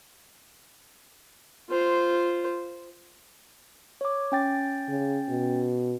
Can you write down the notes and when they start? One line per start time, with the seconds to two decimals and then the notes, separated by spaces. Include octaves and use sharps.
1.70 F4 C5
4.01 C#5 D6
4.32 C#4 G5 A6
4.88 C#3
5.28 B2